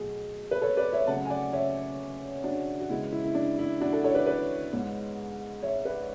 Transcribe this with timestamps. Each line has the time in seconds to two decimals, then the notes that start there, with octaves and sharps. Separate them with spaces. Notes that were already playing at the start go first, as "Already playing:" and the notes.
Already playing: B2 F#3 A3 G#4
0.51 B4
0.62 A4 C#5
0.77 B4 D5
0.93 C#5 E5
1.07 C#3 F#3 A3 F#5 A5
1.25 G#5
1.30 D5 F#5
1.53 C#5 E5
2.44 D4 F#4
2.80 F#4
2.90 C#3 G#3 B3 E4
3.12 E4
3.24 E4
3.35 D4
3.59 E4
3.80 D4 F#4
3.93 F#4 A4
4.04 A4 C#5
4.15 B4 D5
4.26 B4 D5
4.73 G#2 G#3 B3
5.63 C#5 E5
5.85 B4 D5